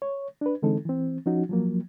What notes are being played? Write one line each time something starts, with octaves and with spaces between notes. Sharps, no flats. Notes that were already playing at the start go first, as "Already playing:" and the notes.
C#5
D4 B4
D3 E3 G#3 C4 D#4 A4
E3 C4
F3 C#4 D#4 F#4
F3 F#3 A#3